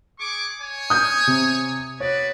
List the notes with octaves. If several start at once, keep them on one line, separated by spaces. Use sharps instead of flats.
G#4 C#6 D6
C#5 G#5
D#6 G6
C3
F#4 B4 C#5 D5